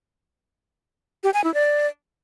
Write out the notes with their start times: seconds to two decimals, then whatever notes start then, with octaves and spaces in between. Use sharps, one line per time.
1.24 G4
1.34 G#5
1.44 E4
1.54 D5